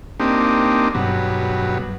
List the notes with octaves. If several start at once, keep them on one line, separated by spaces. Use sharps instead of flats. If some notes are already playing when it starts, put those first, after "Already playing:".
A#3 C4 D4 D#4 G4
G2 B2 F#3